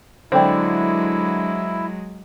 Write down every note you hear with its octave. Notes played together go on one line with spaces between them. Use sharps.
D3 F#3 G#3 C4 D4 E4